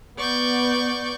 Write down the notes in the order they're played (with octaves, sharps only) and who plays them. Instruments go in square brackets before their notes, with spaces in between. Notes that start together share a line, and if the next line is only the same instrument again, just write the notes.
[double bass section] B3 [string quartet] D5 C#6 G6